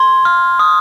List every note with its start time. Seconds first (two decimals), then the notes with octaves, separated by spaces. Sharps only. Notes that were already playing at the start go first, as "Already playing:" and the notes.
Already playing: C6 G#6
0.25 F6
0.59 D#6